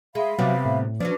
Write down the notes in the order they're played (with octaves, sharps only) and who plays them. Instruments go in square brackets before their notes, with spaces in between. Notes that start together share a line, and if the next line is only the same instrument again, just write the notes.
[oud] G#3 [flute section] E5 F5 B5
[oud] C3 G3 B3 [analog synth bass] F#3
[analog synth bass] A2
[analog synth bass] F3 [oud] F#3 C#4 D4 [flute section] B4 D6